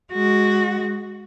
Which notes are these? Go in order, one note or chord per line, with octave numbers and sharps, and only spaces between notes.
G#3 F#4